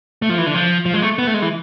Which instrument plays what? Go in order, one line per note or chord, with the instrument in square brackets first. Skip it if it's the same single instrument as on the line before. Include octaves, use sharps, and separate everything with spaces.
[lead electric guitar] A3
F3
E3
D3
F3
F3
G#3
A3
B3
A3
G#3
E3